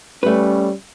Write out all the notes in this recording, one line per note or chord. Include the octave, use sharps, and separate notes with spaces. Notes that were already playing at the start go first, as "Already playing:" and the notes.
G3 A3 C#4 B4